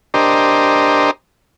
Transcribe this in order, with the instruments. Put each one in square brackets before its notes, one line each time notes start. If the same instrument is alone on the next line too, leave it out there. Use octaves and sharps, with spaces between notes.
[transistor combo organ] D4 G4 A#4 C5 D#5